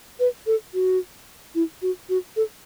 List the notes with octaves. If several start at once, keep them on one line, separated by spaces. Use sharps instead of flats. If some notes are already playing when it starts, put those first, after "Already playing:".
B4
A4
F#4
E4
F#4
F#4
A4